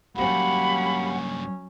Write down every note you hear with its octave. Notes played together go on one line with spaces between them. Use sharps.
G2 F#3 A#3 C#4 G4 F5 F#5 B5